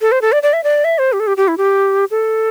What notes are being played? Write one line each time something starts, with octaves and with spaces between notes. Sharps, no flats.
A4
C5
A4
D5
D5
E5
D5
E5
C5
G4
A4
G4
G4
E4
G4
A4